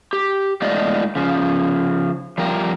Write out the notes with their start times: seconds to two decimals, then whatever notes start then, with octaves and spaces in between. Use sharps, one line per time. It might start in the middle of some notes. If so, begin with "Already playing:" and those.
0.13 G4
0.62 A2 G#3 D#4 F4 D5 D#5
1.15 C#3 F3
2.38 F3 G3 A#4